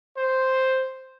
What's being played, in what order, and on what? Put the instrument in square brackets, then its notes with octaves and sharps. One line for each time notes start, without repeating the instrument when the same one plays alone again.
[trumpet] C5